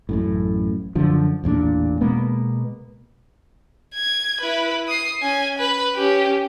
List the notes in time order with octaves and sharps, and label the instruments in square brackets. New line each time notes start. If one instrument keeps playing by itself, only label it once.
[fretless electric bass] A1 F#2 A2
F#2 D3 F3
A1 E2 A#2 D4
B2 G#3 A#3 B3
[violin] G#6
E4 B4
D#6 C7
C#4 G#5
B4
C#4 G4